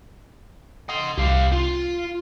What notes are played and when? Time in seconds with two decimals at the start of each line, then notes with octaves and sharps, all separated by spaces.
0.89 D#5 F#5 C6
1.18 C2 G4 F5
1.52 F4 C6